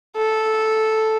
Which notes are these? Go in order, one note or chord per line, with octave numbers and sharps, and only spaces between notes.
A4